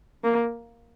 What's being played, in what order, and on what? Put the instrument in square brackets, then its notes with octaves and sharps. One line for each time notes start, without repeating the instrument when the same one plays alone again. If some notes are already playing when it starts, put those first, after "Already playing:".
[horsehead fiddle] A#3